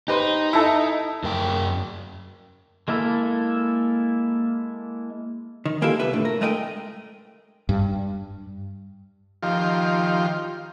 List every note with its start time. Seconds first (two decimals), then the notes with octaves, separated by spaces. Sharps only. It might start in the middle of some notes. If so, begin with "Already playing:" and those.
0.08 D#4 G4 B4 C5
0.53 E4 A4 E5
1.24 F#2 A#4 G5
2.88 G#3 A#3 E4 A4
5.65 D#3
5.82 G#3 A#3 E4 F4 G4 A4
5.99 C2 G3 B3 B4 E5
6.13 A2 D3 A3
6.25 A#4
6.41 G#3 A3 A#4 D#5 F#5 G5
7.69 G2
9.43 D#3 F3 F4 G4